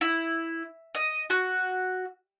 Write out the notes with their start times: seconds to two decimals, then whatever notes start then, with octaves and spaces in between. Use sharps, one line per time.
0.01 E4
0.95 D#5
1.30 F#4